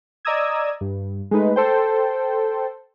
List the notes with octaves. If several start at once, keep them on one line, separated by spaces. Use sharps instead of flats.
D5 D#5 A#5 D#6 E6 G#6
G2
G#3 A3 D#4 B4
A4 C5 G5